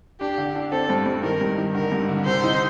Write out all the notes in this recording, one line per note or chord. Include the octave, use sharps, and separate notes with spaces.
D4 G4
D3
D4
C4 A4
G2
G2
D#3 A#4
G2
D#3
D3 A#4
G2
D3
C3 C5
D#4